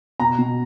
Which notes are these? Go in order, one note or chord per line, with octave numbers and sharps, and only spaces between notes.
B2 A#5
B2